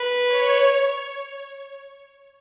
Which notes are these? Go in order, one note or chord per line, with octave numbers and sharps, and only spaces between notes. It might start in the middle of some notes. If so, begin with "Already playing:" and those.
Already playing: B4
C#5